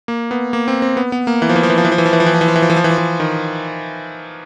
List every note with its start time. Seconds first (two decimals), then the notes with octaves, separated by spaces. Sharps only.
0.08 A#3
0.31 B3
0.53 A#3
0.68 C4
0.82 C4
0.97 B3
1.12 B3
1.27 A#3
1.42 E3
1.49 F3
1.56 E3
1.63 F3
1.70 E3
1.78 F3
1.85 E3
1.92 F3
1.98 E3
2.06 F3
2.13 E3
2.20 F3
2.26 E3
2.34 F3
2.41 E3
2.48 F3
2.56 E3
2.62 F3
2.70 E3
2.76 F3
2.84 E3
2.90 F3
2.98 E3
3.20 D#3